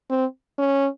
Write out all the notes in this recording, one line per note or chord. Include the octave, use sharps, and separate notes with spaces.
C4
C#4